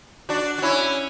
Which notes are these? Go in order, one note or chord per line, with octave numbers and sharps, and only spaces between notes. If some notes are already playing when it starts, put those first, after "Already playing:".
D4 F#4
F#4
C#4 E4